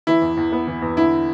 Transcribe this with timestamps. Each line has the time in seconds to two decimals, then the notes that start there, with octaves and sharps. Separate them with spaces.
0.07 E3 E4
0.22 E2
0.37 E2
0.52 B3
0.67 E3
0.82 E2
0.97 D3 E4